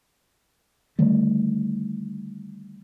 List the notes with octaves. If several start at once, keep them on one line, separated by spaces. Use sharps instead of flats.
D3 D#3 G3 A3